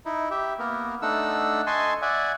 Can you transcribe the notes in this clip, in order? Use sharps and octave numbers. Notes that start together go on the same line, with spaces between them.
D#4 E4
G4 E5
A#3 B3 A#4
A3 D4 D#4 F#5 E6
D#5 G#5 A5 C6 C#6
D5 E5 F#5 G#5